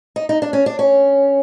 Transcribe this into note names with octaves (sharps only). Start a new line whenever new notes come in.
D#4
D#4
D4
C#4
D4
C#4